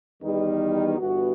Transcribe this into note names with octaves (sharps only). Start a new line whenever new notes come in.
E2 D#3 G3 D#4
G1 G2 E3 B3 F#4